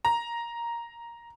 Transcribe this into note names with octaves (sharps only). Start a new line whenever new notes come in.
A#5